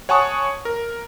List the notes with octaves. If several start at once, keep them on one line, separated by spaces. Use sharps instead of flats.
C#5 F#5 G#5 A5 C#6 D#6
A#4